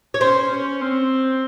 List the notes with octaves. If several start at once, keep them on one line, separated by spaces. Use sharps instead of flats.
C#5
C#4 C5
C#4
C4